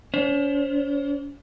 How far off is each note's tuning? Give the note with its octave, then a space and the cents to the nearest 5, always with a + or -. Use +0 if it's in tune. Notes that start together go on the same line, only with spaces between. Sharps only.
C#4 +45 C5 +20